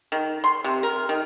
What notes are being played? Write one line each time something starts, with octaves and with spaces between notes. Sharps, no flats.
D#3
C6
C3
A#4
D#3